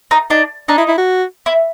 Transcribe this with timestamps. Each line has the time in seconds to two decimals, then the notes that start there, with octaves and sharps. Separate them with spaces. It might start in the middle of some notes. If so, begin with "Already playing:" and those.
0.11 D#4
0.30 D4 D#4
0.68 D4 D#4
0.78 E4
0.88 E4
0.98 F#4
1.46 E4